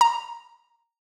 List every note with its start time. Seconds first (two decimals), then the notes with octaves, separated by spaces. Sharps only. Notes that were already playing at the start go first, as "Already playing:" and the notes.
0.01 A#5